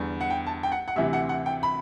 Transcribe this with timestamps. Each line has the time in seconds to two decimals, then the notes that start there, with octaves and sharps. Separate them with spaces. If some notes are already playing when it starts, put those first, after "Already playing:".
Already playing: E2 D3 G3
0.21 F#5
0.30 G5
0.47 A5
0.63 G5
0.72 F#5
0.88 F#5
0.96 D2 C3 E3 E5
1.13 F#5
1.29 F#5
1.46 G5
1.63 B5